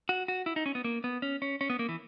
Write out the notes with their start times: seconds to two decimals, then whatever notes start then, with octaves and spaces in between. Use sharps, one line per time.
0.09 F#4
0.28 F#4
0.46 E4
0.56 D#4
0.66 C#4
0.75 B3
0.84 A#3
1.04 B3
1.22 C#4
1.42 C#4
1.61 C#4
1.70 B3
1.79 A#3
1.89 E3